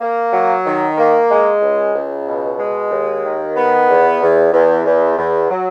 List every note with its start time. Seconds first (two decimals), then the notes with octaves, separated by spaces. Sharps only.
0.01 A#3
0.33 F#3
0.65 D#3
0.98 A#3
1.29 G#3
1.62 C#2
1.95 C#2
2.26 B2
2.59 G#3
2.91 D#2
3.24 D#3
3.55 B3
3.88 E2
4.21 E2
4.53 E2
4.85 E2
5.18 E2
5.50 F#3